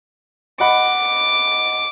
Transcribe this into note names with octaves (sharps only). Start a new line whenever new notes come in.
D#5 F#5 B5 D6